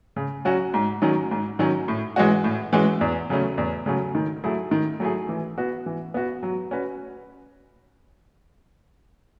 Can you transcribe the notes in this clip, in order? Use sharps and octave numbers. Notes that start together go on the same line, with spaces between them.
C#3
F#3 C#4 F#4
G#2
D#3 F#3 C#4
G#2
D#3 F#3 C#4
A2
E3 G#3 C#4 F#4
A2
E3 G#3 C#4 F#4
E2
C#3 F#3 A3 C#4
E2
C#3 F#3 A3 C#4
D#3
F#3 A3 E4 G#4
D#3
F#3 A3 E4 G#4
E3
B3 F#4
E3
B3 F#4
F#3
C#4 F#4 B4